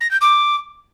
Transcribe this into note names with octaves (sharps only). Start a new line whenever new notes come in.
A#6
G6
D6